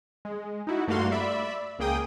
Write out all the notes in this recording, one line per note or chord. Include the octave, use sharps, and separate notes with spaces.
G#3
D#4 E4 F#4
G2 A3 A#3 F#4 F5 C6
D5 E5 B5
C#2 A#3 G#4 G5 D#6